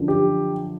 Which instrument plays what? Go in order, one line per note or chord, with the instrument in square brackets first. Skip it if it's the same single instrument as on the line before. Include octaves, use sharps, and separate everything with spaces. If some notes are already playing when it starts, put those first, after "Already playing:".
Already playing: [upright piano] F#2 D3 F3
G4